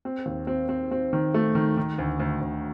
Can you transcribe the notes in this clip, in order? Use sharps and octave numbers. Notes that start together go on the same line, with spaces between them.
C4
D#2
C4
C4
C4
D#3
A3
D#3
D#3
D2
D2
D2